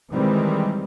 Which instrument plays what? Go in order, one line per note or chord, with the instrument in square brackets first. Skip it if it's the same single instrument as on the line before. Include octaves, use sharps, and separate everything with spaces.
[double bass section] D#3 E3 G3 G#3 C4